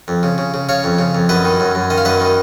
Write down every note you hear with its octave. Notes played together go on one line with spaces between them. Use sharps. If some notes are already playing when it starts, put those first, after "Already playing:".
F2
C#3
C#3
C#3
C#3 C#5 F5
F2
C#3
F2
F#2 B4 D#5
D#3
F#2
F#2
D#3 D#5
F5
F#2 B4 D#5
D#3